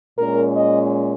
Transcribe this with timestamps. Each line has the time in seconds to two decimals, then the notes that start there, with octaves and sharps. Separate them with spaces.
0.18 A#2 G#3 C#4 A#4
0.55 D#5